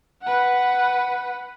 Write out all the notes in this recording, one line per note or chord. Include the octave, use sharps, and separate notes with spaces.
B4 F#5